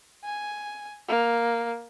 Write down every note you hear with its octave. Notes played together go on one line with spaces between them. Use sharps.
G#5
A#3